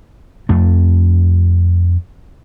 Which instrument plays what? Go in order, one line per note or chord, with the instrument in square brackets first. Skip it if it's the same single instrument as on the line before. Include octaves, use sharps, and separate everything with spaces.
[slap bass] F2 A3